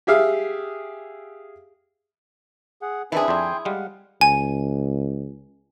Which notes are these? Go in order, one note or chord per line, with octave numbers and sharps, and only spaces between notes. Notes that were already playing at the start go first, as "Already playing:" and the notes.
G4 G#4 E5 F5
G#4 F#5
D#3 E3 C4 D4 E4 G#4 B4
F2 D4 G5 G#5 C6
G3 G#3 F5 F#5
C#2 G#5